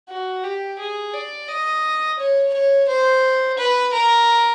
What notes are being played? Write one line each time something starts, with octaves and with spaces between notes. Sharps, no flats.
F#4
G4
G#4
D5
D#5
C#5
C#5
C5
B4
A#4